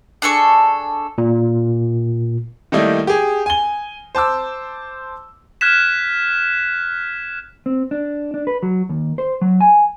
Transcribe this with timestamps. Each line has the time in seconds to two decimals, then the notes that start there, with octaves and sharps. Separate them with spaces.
0.22 D4 G#4 A4 C#6
1.18 A#2
2.72 D#3 G3 A3 A#3 D#4 E4
3.07 G4 G#4
3.46 G#5 G7
4.15 C5 A5 D6 E6
5.61 F6 F#6 G#6 B6 E7
7.66 C4
7.91 D4
8.34 D4
8.47 B4
8.63 F#3
8.89 D#2
9.18 C5
9.41 F#3
9.61 G#5